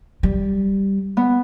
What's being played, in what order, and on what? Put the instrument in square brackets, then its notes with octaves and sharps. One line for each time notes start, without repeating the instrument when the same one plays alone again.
[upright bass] G3
[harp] B3